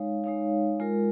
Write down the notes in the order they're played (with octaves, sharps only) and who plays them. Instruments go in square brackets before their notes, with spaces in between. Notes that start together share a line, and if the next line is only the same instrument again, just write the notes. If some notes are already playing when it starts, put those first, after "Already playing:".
Already playing: [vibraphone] G#3 D#4 C#5 F5
G#3 D#4 C#5 F5
G#3 F4 A#4